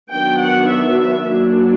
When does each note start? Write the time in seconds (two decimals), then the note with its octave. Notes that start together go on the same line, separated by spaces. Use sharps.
0.12 D#3 F#3 B3 D4 G5
0.41 F#5
0.70 E5
1.28 F#3 A#3 D4